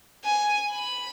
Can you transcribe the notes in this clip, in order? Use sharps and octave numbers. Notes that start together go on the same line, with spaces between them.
G#5
B5